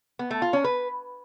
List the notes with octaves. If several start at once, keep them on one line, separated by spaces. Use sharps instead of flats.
B3
A3
F4
C#4
B4